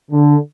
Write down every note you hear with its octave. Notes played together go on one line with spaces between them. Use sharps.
D3